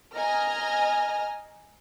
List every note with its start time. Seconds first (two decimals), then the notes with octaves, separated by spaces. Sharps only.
0.14 D#5 G#5 A#5 F6